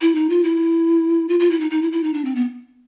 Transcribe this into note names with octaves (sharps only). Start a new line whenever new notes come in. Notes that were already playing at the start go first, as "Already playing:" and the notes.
E4
D#4
F4
E4
F4
F4
E4
D#4
D#4
E4
E4
D#4
D4
C4
B3